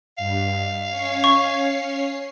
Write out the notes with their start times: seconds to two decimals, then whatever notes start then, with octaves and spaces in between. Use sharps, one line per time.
0.18 G2 F5
0.88 C#4 C#5 C7
1.24 C#6